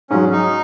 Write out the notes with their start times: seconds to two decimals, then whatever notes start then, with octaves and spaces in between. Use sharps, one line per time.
0.10 G#2 F#3 C#4
0.32 D#4